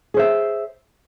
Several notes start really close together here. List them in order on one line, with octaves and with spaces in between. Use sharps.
G#4 C5 E5